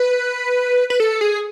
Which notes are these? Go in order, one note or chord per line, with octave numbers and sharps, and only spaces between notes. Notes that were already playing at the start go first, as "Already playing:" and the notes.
Already playing: B4
B4
A4
G#4